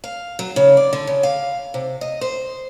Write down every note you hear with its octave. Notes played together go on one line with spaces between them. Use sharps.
F5
F#3
C#3
D5
D3
C#3
F5
C3
D#5
C5